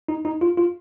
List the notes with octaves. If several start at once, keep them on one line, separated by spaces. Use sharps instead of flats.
D#4
D#4
F4
F4